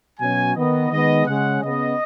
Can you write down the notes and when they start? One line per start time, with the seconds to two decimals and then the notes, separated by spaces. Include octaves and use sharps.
0.20 B2 F#3 C#4 G#5
0.56 D#3 B3 D#5
0.91 D#3 G#3 B3 D#5
1.26 C#3 G#3 C#4 F#5
1.62 C#3 B3 D#5